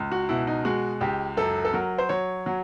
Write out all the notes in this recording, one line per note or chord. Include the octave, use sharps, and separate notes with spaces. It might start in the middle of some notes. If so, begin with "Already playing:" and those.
Already playing: C#2
F#4
B2 E4
D#4
G#3 F#4
C#2 G4
F#2 A4
A4
F#3 A#4
C5
F#3 C#5
F#3